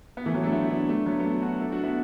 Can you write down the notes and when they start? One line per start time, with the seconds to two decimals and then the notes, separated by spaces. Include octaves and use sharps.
0.17 B3
0.26 E3 A3
0.34 F#3 B3
0.44 A3 D4
0.52 B3 E4
0.70 A3 D4
0.89 A3 D4
1.06 F#3 B3
1.20 B3
1.24 A3 D4
1.42 D4 F#4
1.60 E4 A4
1.72 D4 F#4
1.83 B3 E4